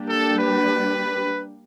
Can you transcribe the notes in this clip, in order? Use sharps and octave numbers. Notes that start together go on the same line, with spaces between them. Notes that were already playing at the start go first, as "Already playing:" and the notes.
Already playing: G3 A#3 D4 G4
A4
B4